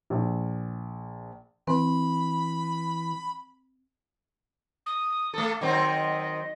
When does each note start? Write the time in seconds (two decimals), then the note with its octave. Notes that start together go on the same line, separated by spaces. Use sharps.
0.10 A#1
1.67 E3 C4 B5
4.86 D#6
5.34 A3 A4
5.61 D#3 F#3 C4 D#5